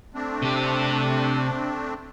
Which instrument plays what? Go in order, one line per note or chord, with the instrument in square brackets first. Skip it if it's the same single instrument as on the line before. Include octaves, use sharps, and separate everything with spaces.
[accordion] A3 C4 D4
[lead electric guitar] C3 G4